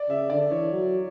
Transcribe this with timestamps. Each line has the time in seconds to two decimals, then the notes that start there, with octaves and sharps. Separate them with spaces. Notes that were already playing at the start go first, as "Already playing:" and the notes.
Already playing: D5
0.09 C#3 E5
0.30 D3 D5
0.50 E3 C#5
0.72 F#3